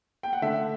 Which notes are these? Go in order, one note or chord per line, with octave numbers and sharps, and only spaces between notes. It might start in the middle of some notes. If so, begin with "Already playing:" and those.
G5
F#5
D3 A3 E5